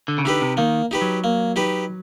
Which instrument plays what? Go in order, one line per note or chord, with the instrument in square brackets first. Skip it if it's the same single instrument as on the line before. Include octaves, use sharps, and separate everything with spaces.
[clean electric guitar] D3
C#3
[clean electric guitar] D3 [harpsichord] D#4 G4 B4
[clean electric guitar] C3
[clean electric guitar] D#3 [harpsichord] A#3
[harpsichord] D#4 G4 B4
[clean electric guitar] F#3
[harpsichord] A#3
D#4 G4 B4